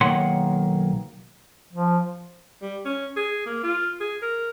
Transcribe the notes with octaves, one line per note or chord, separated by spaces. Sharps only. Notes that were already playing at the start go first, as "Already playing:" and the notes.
B1 D#3 A#3 C#5 F#5 C6
F3
G3
C#4
G#4
A#3
F4
G#4
A#4